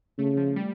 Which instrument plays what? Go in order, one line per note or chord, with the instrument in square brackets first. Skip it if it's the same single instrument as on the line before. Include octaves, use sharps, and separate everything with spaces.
[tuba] C#3 [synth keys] A3
[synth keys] F3
G3